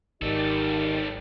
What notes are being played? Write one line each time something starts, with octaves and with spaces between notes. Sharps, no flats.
G#1 D#3 G3 G4 A4 D5 D#5